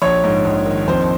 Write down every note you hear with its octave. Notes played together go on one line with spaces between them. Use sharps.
A#1 C#5
G#2
A#1
D#3
F2 C5